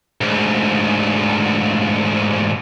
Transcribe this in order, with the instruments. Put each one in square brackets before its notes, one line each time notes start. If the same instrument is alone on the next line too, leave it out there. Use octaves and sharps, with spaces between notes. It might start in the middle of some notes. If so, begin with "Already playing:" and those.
[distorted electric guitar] D2 G#2